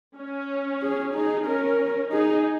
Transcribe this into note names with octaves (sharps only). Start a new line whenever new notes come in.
C#4
G#4
D#4 G#4
C#4 A#4
D#4 G#4